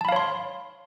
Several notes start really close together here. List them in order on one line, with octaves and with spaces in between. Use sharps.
A5 B5 F5 C#5 C6